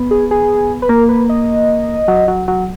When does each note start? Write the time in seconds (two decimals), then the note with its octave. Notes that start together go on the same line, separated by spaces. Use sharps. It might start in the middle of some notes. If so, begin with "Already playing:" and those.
Already playing: B3
0.11 G#4
0.31 G#4
0.82 B4
0.89 A#3 A#4
1.09 B4
1.29 D#5
2.08 F#3
2.28 F#3
2.48 F#3